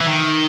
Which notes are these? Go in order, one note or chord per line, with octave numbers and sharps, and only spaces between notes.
E3
D#3